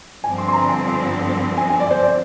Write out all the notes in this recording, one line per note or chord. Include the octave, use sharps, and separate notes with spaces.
G2 D3 F3 C4 G#5
C6
C6
A#5
G#5
G#5
G#5
D5
C5
D5